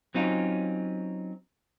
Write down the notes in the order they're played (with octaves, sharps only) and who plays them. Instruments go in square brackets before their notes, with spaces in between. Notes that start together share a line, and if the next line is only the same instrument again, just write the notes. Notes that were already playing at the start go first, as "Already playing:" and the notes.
[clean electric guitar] F#3 C4 C#4 D#4 F4